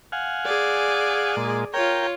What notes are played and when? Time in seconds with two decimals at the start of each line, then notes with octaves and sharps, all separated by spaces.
0.12 F5 F#5 G#5
0.46 G#4 D5
1.37 A#2 G#3
1.74 F4 A#4 C#5 G5